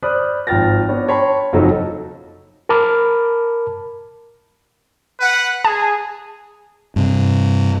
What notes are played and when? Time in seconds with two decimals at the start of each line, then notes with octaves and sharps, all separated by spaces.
0.03 C5 D5 B5 D#6 F6 F#6
0.47 G#1 F3 G5 F6 A6 A#6
0.88 B3 D4 C#5
1.08 C#5 G5 A5 B5 C6
1.53 F#1 F2 F#3 D#4 A4 C#5
2.69 A#4 A5 B5 D6 F6
5.19 B4 F#5
5.65 G#4 A5
6.96 G2 C3